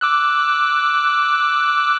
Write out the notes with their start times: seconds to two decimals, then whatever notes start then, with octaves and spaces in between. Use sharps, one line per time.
0.01 D6 E6 F#6